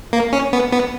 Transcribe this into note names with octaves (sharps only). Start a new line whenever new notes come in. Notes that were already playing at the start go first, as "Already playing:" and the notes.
A#3
C#4
B3
B3